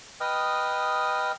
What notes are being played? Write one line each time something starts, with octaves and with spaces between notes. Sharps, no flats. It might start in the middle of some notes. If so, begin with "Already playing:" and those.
B4 D#5 G5 D#6 F6